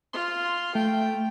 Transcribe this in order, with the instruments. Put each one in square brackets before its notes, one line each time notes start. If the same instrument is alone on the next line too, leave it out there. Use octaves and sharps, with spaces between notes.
[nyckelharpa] F4 [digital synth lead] C6
[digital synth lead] A3 [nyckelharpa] G5